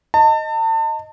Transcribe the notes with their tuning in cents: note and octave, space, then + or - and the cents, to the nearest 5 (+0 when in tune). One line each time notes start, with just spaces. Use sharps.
D#5 +0 A5 +35